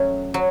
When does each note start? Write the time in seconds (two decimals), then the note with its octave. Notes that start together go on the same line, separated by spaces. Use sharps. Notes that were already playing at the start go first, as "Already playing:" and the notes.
Already playing: F#3 A3 C#4
0.34 F#3